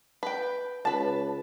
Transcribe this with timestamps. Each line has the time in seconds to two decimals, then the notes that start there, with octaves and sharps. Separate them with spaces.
0.23 B4 G5
0.85 C#2 B4 A5